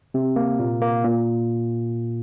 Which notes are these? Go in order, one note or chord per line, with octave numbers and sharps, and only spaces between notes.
C3
A#3
A#2
A#3
A#2